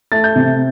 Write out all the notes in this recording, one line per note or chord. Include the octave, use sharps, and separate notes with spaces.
A3 A6
G6
C3